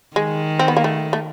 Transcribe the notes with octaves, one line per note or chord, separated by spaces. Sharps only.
D#3 G#3
C4
B3
A#3
A3
A3